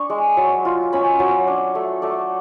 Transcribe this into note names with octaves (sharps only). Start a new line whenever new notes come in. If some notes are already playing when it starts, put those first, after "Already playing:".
Already playing: D4 B5 C#6
G#3
F#3
F4
C#4 B5
F#3
D4
A3
A3 D5